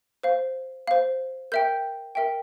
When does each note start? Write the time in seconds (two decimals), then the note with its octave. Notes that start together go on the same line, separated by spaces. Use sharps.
0.23 C5 F5
0.87 C5 F5
1.52 A#4 E5 G5 G6
2.15 A#4 E5 G5